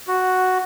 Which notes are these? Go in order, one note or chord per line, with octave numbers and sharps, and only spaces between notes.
F#4